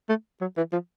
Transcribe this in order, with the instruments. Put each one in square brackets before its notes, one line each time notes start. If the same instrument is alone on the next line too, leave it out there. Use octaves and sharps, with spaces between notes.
[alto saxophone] A3
F#3
E3
F3